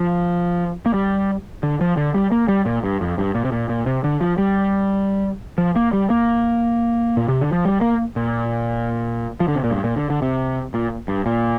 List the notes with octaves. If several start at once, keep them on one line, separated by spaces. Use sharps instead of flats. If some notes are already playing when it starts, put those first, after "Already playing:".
Already playing: F3
A#3
G3
D3
F3
D3
G3
A#3
G3
A#2
G2
F2
G2
A#2
C3
A#2
A#2
C3
D3
F3
G3
F3
A#3
G3
A#3
A#2
C3
D3
F3
G3
A#3
A#2
F3
D3
C3
A#2
G2
A#2
D3
D3
C3
A#2
G2
A#2